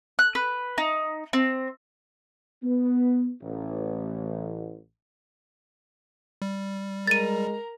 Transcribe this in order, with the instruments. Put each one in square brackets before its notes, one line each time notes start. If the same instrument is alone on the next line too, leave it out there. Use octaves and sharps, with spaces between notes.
[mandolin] F#6
B4
D#4
C4
[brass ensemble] B3
A1
[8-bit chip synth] G3
[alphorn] G#3 [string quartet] A#4 A#5 [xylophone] A6 D#7